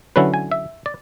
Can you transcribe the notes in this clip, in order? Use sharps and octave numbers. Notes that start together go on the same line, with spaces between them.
D3 F#3 C#4 E4 B4
G#5
E5
D5